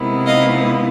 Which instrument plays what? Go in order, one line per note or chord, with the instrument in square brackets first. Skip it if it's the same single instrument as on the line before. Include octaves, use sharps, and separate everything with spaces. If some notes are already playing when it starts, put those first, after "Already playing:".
Already playing: [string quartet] C3 D#3 G#3 B3 E4
D#5 F5